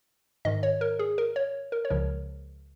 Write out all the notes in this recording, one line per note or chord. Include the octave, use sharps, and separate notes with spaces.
G#2 D#3 D#5
C#5
A#4
G#4
A#4
C#5
A#4
C#5
C#2 C#3 F3 A#4